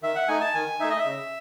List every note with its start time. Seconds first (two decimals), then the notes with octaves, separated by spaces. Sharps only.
0.02 D#3 E5
0.15 F#5
0.28 A3 D#4 G#5
0.41 A5
0.54 D#3 G#5
0.80 A3 D#4 E5
0.90 D#5
0.98 E5
1.05 C#3